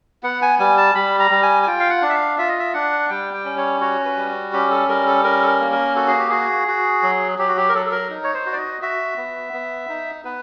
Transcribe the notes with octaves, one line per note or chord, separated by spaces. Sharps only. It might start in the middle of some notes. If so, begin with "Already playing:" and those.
B3 F#5
G#5
G3 G#5
A5
G3 B5
A#5
G3
G#5
G#5
F4 G5
F5
F#5
D4
E5
F5
F4 E5
D#5
E5
D4 F#5
G3 G5
G5
C#4
C#5
F#4 C#5
B4
G3
C#4 G4
A4
G3 A#4
A4
C#4 A#4
A4
A#4
A#3
A#4
F#4 A4
G#4
G4
F#4 G#4
F#4
F#3
F#3 G4
F#4
G4
A#4
F#3 A4
A4
A#4
D#4
C#5
C5
F#4
D5
D#5
F#4 E5
B3
B3
D#4
B3 B4